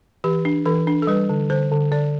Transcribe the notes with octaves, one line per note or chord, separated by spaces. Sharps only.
E3 G4
D4
E3 A4
D4
A4
G3 B4
D3
D3 C5
D3
D3 D5